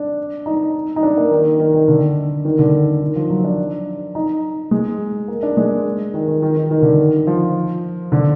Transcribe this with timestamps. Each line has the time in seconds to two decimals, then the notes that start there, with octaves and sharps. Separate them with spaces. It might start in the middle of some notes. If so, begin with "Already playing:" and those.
Already playing: D4
0.46 D#4
0.96 D#4
1.03 D4
1.17 A#3
1.31 D#3
1.60 D#3
1.74 D#3
1.88 D3
2.45 D#3
2.59 D3
3.02 D#3
3.16 F3
3.30 F#3
3.44 D4
4.15 D#4
4.71 G#3
5.28 A#3
5.43 D4
5.57 G#3
6.14 D#3
6.28 D#3
6.42 D#3
6.56 D#3
6.71 D#3
6.82 D3
6.93 D#3
7.27 F3
8.12 D3